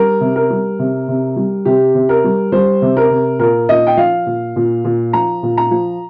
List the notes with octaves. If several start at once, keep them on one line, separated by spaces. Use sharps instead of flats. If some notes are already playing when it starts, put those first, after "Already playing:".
Already playing: G3 A#4
C3
A#4
G3
C3
C3
G3
C3 G4
C3
A#4
G3
G3 C5
C3
A#4
C3
A#2 A#4
A#2 D#5
G5
F3 F5
A#2
A#2
A#2
F3 A#5
A#2
A#5
F3